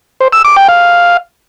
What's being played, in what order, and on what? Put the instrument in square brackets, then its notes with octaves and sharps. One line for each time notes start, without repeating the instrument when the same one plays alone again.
[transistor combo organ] C5
E6
D6
G5
F5